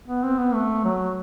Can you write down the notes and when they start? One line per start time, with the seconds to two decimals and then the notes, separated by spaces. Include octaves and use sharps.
0.08 B3
0.24 C4
0.39 B3
0.54 A3
0.85 F#3